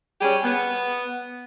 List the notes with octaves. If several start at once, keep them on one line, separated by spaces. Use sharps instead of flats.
G3 C#4 G4 G#4
B3